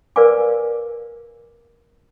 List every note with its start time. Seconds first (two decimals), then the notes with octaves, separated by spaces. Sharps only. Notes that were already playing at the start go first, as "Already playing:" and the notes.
0.16 A#4 B4 D5 F5 G#5 D6